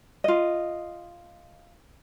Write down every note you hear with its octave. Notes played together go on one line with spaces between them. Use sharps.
F4 D#5